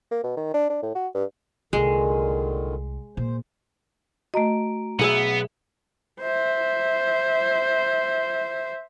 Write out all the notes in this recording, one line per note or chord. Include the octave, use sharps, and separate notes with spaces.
A#3
B2
D#3
D4
D4
A2
F#4
G2
C2 A#2 D3 D#3 G#3
A#2 C5
A3 F#4 D#5 A#5 D7
B1 B3 G#4 E5
C5 E5